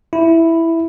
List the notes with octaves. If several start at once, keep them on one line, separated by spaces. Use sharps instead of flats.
E4